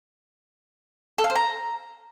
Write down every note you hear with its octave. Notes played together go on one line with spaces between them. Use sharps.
A4
F5
C5
A#5